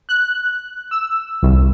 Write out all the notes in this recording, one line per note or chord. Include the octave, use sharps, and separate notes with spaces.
F#6
E6
C2